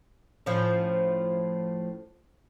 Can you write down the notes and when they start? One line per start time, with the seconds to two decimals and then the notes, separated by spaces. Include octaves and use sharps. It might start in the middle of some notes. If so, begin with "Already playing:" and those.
0.46 A2 F3 C#4